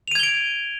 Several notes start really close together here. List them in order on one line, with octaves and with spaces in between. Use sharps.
F7 D#7 G#6 G7 D7